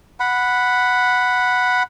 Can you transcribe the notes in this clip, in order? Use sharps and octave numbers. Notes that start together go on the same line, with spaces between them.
F#5 B5